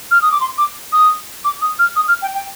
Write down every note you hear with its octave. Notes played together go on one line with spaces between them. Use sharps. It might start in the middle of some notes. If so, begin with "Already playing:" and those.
F6
D#6
D6
C6
D6
D#6
D6
D#6
F6
D#6
F6
G5
G5